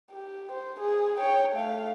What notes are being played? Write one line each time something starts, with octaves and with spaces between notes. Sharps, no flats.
G4
C5
G#4
C#5 G5
A3 F5